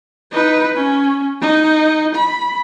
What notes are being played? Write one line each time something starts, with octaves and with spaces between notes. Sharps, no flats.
D#4 B4
C#4
D#4
B5